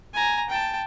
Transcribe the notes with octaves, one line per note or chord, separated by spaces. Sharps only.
G#5 A#5
G5 A5